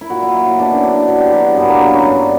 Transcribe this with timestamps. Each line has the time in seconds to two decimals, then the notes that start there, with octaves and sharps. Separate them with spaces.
0.01 E4
0.10 A#2 F#4
0.23 E4
0.34 F#3 E4
0.47 E4
0.59 B2 D4
0.71 C#4
0.83 F#3 D4
0.95 D4
1.08 B2 D4
1.20 G4
1.32 F#3 G4
1.45 F#4
1.57 G2 B3
1.69 A#3
1.81 F#3 B3
1.94 C#4
2.06 G2 D4